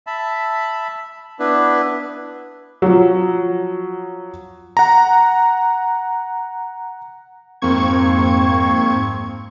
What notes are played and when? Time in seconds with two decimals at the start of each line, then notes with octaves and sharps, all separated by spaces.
0.07 E5 A5 B5
1.39 B3 D4 E4 B4
2.82 F3 F#3
4.77 F#5 A#5
7.62 F2 G#2 A#3 C4 C#6 G#6